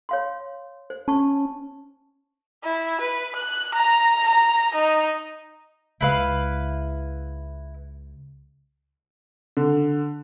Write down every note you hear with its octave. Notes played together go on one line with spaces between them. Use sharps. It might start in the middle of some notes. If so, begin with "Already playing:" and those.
C#5 F5 C6
C5
C#4 A5 C#6
E4
B4
F#6
A#5
A#5
D#4
C#2 E4 B4 F5
D3